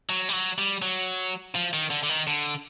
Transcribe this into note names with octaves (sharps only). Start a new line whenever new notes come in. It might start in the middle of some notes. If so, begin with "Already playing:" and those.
F#3
G3
F#3
G3
F#3
F3
D#3
D3
D3
D#3
D3